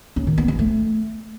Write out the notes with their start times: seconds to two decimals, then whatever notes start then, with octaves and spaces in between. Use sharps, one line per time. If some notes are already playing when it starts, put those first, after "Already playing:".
0.16 C#4
0.27 D#3
0.38 B3
0.48 F3
0.59 A3